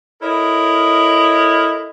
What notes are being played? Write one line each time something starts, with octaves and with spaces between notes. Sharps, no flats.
E4 A4 A#4 C#5 D#5